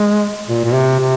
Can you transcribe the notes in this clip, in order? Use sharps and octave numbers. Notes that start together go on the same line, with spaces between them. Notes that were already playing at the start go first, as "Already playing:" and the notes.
Already playing: G#3
A#2
A#2
C3
C3